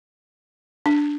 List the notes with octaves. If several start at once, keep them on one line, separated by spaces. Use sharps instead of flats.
D4